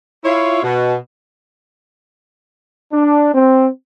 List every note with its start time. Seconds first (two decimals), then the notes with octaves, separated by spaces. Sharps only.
0.24 E4 F4 C#5
0.63 B2
2.92 D4
3.33 C4